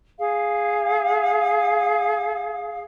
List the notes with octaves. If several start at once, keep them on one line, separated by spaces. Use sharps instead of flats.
G#4 F5